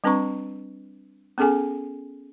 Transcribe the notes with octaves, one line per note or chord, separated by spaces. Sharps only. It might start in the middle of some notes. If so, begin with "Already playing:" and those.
G3 C4 D4 B4 A#5 C#6
B3 C#4 G#4 A4 G#5